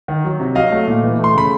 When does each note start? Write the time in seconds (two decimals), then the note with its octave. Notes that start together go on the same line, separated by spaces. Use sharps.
0.08 D#3
0.25 F#3
0.40 C3
0.55 F#3 D#5 F5
0.72 A3
0.87 A#2
1.03 E3
1.18 A3
1.24 C6
1.34 C#3 B5